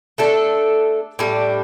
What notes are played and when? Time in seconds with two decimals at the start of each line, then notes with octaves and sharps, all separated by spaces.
0.18 A3 D4 A4
1.19 A2 G3 D4